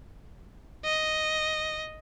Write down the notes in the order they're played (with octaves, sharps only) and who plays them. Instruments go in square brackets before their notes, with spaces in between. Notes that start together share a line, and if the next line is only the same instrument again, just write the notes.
[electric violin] D#5